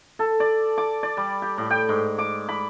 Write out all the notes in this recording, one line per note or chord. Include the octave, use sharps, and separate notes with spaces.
A4
D5
D6
D5
G3
G4
A2
G5
G#2
D6
B5